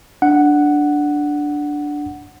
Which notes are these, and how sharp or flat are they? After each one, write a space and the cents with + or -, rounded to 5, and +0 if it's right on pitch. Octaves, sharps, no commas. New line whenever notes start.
D4 +0 F#5 +0